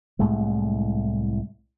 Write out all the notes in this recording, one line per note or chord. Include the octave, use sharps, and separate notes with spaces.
C2 A2 G#3 A3